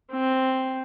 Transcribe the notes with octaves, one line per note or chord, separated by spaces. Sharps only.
C4